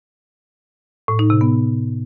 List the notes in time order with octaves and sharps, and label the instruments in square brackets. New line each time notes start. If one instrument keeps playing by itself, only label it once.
[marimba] A2
D#4
C3
B3